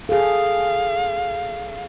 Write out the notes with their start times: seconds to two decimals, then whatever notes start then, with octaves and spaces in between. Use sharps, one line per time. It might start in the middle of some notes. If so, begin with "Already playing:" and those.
0.09 G#4 A4 F5